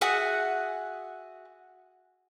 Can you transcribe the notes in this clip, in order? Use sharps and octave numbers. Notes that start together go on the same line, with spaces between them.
F#4 G#4 E5 F#5